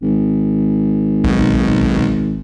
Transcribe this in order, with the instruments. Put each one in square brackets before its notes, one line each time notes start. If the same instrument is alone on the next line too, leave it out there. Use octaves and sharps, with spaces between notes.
[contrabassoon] G#1
[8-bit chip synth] B1